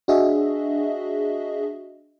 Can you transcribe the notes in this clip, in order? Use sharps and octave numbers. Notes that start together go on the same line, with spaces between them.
D4 F#4 G#4 D#5 E5